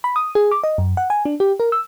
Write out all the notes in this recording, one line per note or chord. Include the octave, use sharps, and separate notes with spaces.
B5
D#6
G#4
D6
D#5
F#2
F#5
G#5
D4
G4
A#4
E6